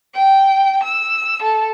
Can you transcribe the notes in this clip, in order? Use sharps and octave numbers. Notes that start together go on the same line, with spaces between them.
G5
E6
A4